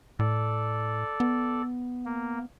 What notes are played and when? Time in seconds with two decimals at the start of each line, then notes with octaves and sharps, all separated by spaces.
0.19 A2 A4 D5
1.20 B3
2.05 A#3